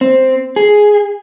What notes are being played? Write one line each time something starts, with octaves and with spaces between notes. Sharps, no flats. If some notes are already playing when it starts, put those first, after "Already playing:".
C4
G#4